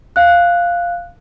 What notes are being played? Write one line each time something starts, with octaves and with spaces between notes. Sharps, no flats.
F5 F#6